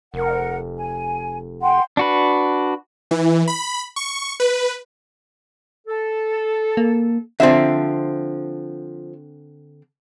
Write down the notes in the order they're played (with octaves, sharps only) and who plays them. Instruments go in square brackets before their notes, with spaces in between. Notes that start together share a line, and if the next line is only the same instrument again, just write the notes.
[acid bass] F1 [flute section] A#4 F#5
[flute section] G#5
F#5 G5 C6
[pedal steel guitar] D4 F#4 B4
[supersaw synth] E3
B5
C#6
B4
[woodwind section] A4
[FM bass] A#3
[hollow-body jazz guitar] D3 C4 [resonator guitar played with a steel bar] F3 E5